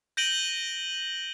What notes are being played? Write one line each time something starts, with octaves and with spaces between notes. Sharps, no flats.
G6 A#6 D7 D#7 F#7 G7